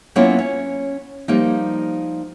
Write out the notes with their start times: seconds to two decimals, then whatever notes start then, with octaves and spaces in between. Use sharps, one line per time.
0.16 F#3 A#3 B3 C#4 E4 F4
0.39 C#4
1.28 F3 G3 A#3 D#4